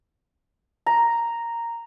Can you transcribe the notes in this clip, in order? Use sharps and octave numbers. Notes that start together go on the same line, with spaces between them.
A#5